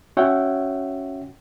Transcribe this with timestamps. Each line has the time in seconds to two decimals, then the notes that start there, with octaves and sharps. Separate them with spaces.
0.17 C#4 F#4 C#5 E5 F#5 G5